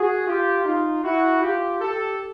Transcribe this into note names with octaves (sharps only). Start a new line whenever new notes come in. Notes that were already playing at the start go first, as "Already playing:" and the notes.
Already playing: F#4 G#4
F4 G4
D#4 F4
E4 F#4
F4 G4
G4 A4